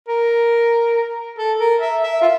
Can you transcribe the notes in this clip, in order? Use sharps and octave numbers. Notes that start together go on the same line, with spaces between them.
A#4
A4
A#4
E5
E5
F4